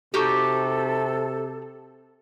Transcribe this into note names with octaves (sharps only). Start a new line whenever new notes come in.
C3 D#4 F#4 G4 A4